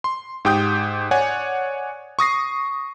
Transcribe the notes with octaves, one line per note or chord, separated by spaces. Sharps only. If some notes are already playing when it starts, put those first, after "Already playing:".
C6
G#2 G4 G5 D#6 G6
C#5 D5 F#5 G#5
C#6 D#6 A#6 C7